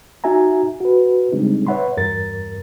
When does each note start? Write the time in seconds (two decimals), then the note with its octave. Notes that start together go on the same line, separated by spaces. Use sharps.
0.24 D#4 F#4 E5 G#5 A#5
0.80 F#4 B4
1.32 C#3 G3 G#3 C4 D4 D#4
1.67 B4 C#5 E5 F#5 B5 C6
1.97 E2 G2 A#4 A6